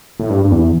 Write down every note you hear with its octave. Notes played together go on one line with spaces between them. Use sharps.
A2
G2
G2
E2